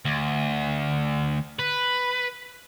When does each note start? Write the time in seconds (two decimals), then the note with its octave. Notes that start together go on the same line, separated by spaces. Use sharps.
0.05 D2
1.59 B4